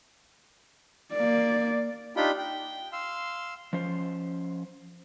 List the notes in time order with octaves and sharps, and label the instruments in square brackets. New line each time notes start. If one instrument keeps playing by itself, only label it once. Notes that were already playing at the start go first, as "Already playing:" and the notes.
[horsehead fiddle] A#3 D5
[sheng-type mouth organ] D4 D#4 F4 G4 G5 B5
G5
F5 C6 E6
[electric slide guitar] F3 C#4 C5